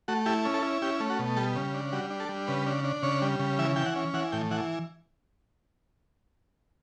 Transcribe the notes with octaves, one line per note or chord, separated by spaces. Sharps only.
A3 F#4
E4 G4
C#4
A4
E4
C#4 G4
A3
F#4
B2
G3 A4
C#3
D4
G3 F#4
D4
A4
G3
C#3 B4
D4
D4
C#3 C#5
G3
C#3
E3 E5
E3 G5
F#5
C#4
E3 F#5
A2 G5
E3 F#5